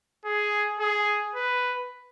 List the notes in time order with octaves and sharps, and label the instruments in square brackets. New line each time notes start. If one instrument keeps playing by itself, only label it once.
[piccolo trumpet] G#4
G#4
B4